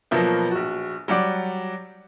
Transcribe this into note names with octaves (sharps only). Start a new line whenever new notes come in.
B2 F3 F#3 A#3 B3
A#1 F#4
F#3 G3 D5 F#5 D6